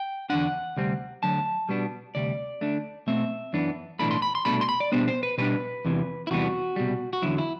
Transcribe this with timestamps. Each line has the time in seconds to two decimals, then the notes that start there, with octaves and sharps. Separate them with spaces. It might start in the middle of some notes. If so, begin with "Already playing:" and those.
Already playing: G5
0.30 E2 D3 A3 D4 F#5
0.77 D2 C3 G3 C4
1.23 D2 D3 F#3 A5
1.69 B2 G3 B3 D4
2.15 D2 C3 G3 D5
2.61 D2 D3 A3 D4
3.07 B2 A3 C4 E5
3.53 F#2 E3 B3 D4
3.99 B1 A2 E3 A3 D4 B5
4.11 C6
4.22 B5
4.35 C6
4.45 C2 B2 A3 D4 B5
4.61 C6
4.69 B5
4.80 D5
4.92 B2 G3 B3 D4 C5
5.08 C5
5.23 B4
5.38 B2 G3 D4 B4
5.85 E2 C3 E3
6.27 E4
6.31 E2 C3 E3 G3 B3 F#4
6.76 C2 B2 G3
7.13 F#4
7.22 E2 D3 F#3 E4
7.38 E4